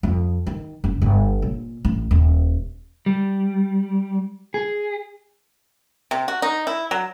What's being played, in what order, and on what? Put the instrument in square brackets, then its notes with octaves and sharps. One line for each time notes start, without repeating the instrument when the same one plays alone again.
[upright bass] F2
D#3
F#1
G1
A#2
A1
D#1
[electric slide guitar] G3
G#4
[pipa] C3
F#4
D#4
E4
F#3